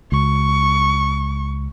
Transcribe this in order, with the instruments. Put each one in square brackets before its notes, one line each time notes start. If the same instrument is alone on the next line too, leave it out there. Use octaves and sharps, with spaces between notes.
[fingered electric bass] C#2 [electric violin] C#6